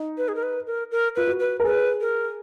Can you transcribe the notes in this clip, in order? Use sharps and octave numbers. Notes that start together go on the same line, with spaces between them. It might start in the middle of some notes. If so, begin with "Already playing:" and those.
Already playing: D#4
B4
G#4
A#4
B4
A#4
A#4
F4 B4
F#4
B4
A#4
G#4 B4
A#4